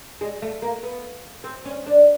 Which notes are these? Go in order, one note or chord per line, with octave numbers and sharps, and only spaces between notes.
G#3
A3
A#3
B3
C4
C#4
D4